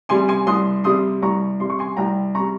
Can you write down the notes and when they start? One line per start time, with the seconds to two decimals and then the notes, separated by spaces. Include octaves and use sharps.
0.09 C3 G3 G#5 C6
0.28 G#5 C6
0.47 C2 C6 D#6
0.84 C3 G3 C6 D#6
1.22 C2 A#5 C#6
1.60 C3 G3 C6
1.70 C#6
1.79 G#5 C6
1.97 C2 G5 A#5
2.35 C3 G3 A#5 C#6